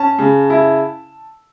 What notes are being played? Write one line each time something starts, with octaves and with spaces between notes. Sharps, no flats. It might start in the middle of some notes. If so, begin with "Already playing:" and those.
Already playing: C#4 A5
C#3
E4